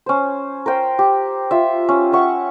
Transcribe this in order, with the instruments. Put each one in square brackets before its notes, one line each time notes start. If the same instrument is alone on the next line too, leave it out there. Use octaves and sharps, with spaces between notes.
[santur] C#4 C5
A#4 C5 G5
G4
F4 E5
C#4
E5 F#5 C#6